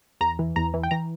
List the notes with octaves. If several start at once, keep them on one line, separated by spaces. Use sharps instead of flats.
E2 A#5
E3
E2 A#5
E3
G5
E3 A#5